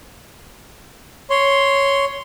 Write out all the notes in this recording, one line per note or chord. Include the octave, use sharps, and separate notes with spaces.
C#5 C6